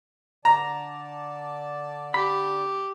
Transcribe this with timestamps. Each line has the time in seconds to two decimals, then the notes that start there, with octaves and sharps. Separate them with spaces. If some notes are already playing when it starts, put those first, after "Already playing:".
0.45 D3 D5 A5 A#5
2.14 G4 B5